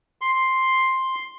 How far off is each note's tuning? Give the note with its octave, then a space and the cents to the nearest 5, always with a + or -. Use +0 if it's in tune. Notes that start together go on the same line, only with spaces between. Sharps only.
C6 +5